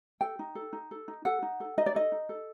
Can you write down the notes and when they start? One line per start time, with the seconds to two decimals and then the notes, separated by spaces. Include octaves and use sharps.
0.21 A4 G5
0.39 D#4
0.55 A4
0.73 D#4
0.91 A4
1.08 D#4
1.25 A4 F#5
1.42 D#4
1.60 A4
1.78 D#4 D#5
1.86 D5
1.95 A4 D#5
2.12 D#4
2.29 A4